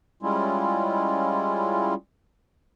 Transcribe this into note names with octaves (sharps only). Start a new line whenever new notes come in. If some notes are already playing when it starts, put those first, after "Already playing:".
G3 G#3 C#4 E4 F4